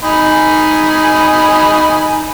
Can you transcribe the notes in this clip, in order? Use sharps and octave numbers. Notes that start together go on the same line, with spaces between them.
D#4 G#5 B5